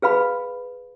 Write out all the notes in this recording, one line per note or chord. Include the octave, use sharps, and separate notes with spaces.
G#4 B4 F5 B5